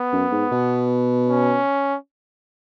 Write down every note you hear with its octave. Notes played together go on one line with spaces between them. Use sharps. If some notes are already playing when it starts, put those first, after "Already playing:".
Already playing: B3
F#2
G#2
B2
C#4